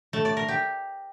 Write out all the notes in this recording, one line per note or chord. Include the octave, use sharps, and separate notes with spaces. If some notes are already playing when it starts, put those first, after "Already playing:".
A3
D5
A#4
G4